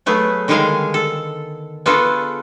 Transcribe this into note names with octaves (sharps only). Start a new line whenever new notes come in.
F#3 A3 B3 G#4
D3 D#3 G3 G#3 G#4 F5
A4
B3 D4 F4 F#4 G#4 A4